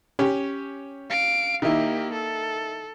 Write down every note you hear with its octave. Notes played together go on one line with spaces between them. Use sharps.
C#4 G4
F5 D7
D#3 A#3 E4 G4
A4